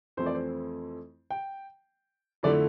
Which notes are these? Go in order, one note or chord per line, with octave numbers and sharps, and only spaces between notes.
F2 E3 A3 C4 E4 C5
D5
C5
G5
F2 D3 A3 E4 D5